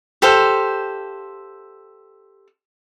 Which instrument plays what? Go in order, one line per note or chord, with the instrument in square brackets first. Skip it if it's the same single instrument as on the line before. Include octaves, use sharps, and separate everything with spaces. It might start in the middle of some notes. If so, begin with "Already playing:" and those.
[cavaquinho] G4 A4 C5 F5